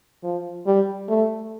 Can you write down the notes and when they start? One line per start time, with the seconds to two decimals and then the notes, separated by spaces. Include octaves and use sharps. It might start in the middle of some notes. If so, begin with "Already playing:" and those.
0.23 F3
0.67 G3
1.09 A3